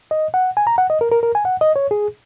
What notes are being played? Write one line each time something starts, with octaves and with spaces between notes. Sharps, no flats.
D#5
F#5
G#5
A#5
F#5
D#5
A#4
A#4
A#4
G#5
F#5
D#5
C#5
G#4